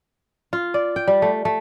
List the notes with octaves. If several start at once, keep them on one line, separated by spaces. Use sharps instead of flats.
F4
D5
G5
G3
A3
A3